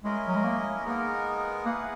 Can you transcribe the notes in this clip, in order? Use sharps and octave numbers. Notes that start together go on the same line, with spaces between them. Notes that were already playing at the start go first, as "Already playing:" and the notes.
G#3 C#4 E4 A#4 D#5
F#3
G#3
A#3
G#3 A#3 B3 D#4 A#4
A#3 E4 G#4 B4 F#5